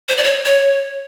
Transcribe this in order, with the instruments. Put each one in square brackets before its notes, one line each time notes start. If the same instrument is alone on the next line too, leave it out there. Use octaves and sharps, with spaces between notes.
[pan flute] C5
D5
C#5
C#5